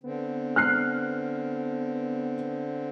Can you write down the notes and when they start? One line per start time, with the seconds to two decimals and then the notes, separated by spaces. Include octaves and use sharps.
0.03 D3 B3 C4
0.56 F6 F#6 C7